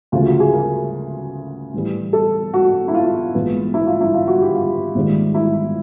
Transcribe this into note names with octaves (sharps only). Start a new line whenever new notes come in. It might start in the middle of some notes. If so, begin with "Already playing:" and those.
D2 C#3 F3 A3 F4
F#4
G#4
A#4
A2 E3 G3
A4
F#4
E4
F4
A#1 G#2 E3 G#3 B3
E4
F4
E4
F4
F#4
G4
F4
A#1 G#2 D#3 G3
E4